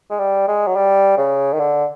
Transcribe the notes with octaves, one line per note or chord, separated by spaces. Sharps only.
G#3
G3
G#3
F#3
G3
C#3
D#3
D3